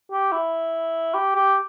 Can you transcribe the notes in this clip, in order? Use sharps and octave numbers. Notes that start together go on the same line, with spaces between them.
G4
E4
G4
G4